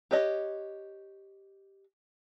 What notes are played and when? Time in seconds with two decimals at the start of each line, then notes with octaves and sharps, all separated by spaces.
0.11 G4 B4 C#5 D#5